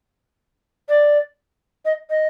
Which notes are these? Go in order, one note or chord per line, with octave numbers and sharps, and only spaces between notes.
D5
D#5
D#5